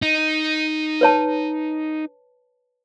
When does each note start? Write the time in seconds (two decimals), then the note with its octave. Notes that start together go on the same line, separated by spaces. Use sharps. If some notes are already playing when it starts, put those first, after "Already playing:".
0.02 D#4
1.01 B4 C#5 A5